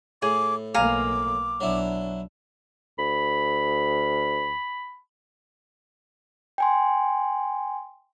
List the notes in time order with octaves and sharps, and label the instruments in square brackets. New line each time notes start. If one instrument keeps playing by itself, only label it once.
[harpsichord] A2 [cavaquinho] G#4 [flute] D6
[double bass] B1 A#3 [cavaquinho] F5 G#5 A#5 [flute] D6
[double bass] B1 D4 [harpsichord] F#3 E4
[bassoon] D2 [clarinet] B5
[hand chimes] G5 G#5 C6